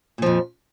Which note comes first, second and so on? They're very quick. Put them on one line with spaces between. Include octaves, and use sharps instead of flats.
A#2 F3 F2